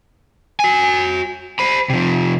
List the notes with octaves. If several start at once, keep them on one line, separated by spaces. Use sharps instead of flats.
F#4 G#5
C5 B5
C3 F3